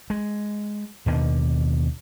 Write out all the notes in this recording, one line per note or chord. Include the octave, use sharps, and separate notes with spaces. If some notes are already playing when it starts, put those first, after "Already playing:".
G#3
D#2 B2 D3 D#3